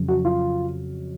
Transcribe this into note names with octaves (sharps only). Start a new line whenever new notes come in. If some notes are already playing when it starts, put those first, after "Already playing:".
Already playing: F2 C#3 F#3
F#4
F4